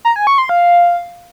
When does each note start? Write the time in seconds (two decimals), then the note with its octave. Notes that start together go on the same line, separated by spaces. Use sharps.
0.05 A#5
0.16 G#5
0.27 C#6
0.38 C6
0.49 F5